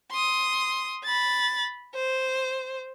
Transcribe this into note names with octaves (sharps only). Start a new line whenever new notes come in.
C6 D#6
B5 A6
C5